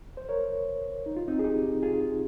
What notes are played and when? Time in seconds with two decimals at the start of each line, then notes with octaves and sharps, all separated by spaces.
0.17 C5
0.29 A#4 C#5
1.06 D#4
1.17 F4
1.28 C4 D#4
1.39 G#4
1.44 D#4 G4
1.83 F4 G#4